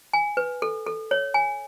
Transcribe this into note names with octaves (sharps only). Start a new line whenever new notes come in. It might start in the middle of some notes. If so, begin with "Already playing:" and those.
G#5
B4
A4
A4
C#5
G#5